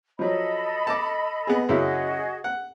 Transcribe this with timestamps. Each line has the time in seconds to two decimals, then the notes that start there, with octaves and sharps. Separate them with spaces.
0.19 F3 F#3 A4 D#5 B5
0.87 A5 D6
1.47 B3 G#4
1.69 F#2 C#3 E4 F#4 G#4 D#5
2.44 F#5